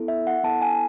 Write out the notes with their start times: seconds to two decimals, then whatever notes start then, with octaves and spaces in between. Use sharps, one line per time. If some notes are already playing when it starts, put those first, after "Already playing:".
Already playing: B3 E4 A4
0.08 E5
0.27 F#5
0.44 B3 E4 A4 A5
0.62 G#5